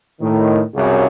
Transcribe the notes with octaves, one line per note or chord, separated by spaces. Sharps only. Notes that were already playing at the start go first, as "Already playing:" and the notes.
A2 D#3
C2 F#2 C#3